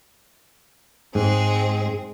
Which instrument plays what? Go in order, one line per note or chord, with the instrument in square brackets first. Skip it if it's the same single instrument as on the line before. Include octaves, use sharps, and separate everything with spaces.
[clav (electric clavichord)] G#2 [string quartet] G#3 C4 G#4